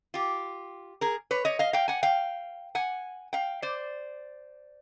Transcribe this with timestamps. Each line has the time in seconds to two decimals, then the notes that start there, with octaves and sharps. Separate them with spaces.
0.14 F4 G4
1.01 G#4 A#4
1.31 B4 C#5
1.45 C#5 D#5
1.59 D#5 F5
1.73 F5 G5
1.88 F#5 G#5
2.03 F5 G5
2.75 F#5 G#5
3.33 F5 G5
3.62 C5 D5